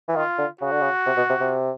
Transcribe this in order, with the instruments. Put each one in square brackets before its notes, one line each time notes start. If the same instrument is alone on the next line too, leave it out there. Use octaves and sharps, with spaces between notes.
[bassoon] E3
[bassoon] D#3 [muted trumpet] F4
[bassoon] D3
[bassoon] C#3 [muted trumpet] F#4
[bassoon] D3
C#3
C3
B2
C3
C3